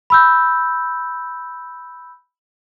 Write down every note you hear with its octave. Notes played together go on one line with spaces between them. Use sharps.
B5 E6 G6